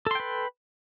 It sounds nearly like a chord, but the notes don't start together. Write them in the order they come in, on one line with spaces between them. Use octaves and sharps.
A4 C6 G5 B4